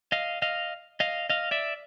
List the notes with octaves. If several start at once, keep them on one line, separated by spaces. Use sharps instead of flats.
D#5 F5
D#5 F5
D#5 F5
D#5 F5
D5 E5